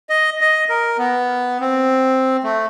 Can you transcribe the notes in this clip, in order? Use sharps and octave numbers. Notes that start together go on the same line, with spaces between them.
D#5
D#5
A#4
B3
C4
A3